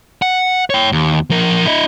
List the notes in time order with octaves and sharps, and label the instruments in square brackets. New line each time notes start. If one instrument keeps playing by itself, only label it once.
[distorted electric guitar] F#5
C#5 G5
D#2
F3 A#4
E4 D#5